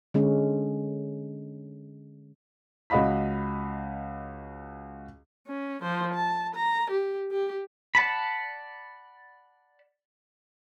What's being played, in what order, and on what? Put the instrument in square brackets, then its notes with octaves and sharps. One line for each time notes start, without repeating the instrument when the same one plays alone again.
[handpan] D3 G#3 C#4
[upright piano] C#2 F#4 D#5 F5 B5 B6
[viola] C#4
F3 C5
A5
A#5
G4
G4
[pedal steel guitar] D5 F#5 A5 B5